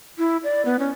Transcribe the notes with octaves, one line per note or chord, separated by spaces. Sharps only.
E4
D5
B3
C#4